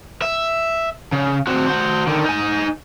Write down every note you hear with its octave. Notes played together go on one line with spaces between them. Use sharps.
E5
C#3
C4 F#4
F#4 C5
D3 D#3
D#4 G#5